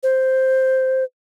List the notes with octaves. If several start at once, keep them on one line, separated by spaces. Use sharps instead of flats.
C5